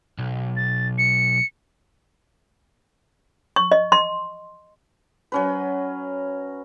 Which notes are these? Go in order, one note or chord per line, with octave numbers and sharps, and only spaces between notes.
B1
A6
C#7
C#6
D#5
C6
F#3 C#4 B4